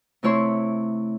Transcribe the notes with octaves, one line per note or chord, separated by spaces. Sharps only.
C3 A3 E4 C#5 C6